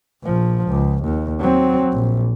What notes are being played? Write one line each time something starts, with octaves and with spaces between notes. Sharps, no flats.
A#1 F3
C#2
D#2
F#3 C4
A#1